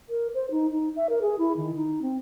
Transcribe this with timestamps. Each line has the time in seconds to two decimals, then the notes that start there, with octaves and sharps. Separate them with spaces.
0.09 A#4
0.34 C5
0.51 D#4
0.72 D#4
0.96 E5
1.09 A#4
1.21 G#4
1.38 E4
1.57 D#3
1.76 D#4
2.02 C4